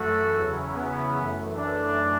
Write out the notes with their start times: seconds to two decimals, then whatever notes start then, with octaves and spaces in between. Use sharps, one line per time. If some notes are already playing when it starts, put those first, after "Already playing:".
Already playing: F#2 E3 A3 F#4 A4
0.34 E2 C#3 F#3 C#4 E4
0.75 B3
1.16 F#2 E3 A3
1.56 D4